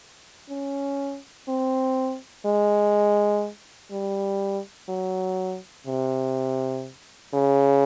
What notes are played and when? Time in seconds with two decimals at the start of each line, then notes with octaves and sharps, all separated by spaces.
0.50 C#4
1.49 C4
2.46 G#3
3.91 G3
4.89 F#3
5.87 C3
7.34 C#3